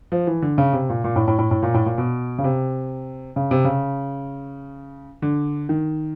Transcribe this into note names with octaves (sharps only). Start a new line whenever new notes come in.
F3
E3
D3
C#3
C3
A#2
A#2
A2
A2
A2
A2
A#2
A2
A#2
B2
C#3
C3
C#3
C3
C#3
D3
D#3